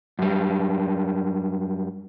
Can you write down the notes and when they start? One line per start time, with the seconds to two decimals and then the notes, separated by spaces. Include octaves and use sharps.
0.19 F#2 G3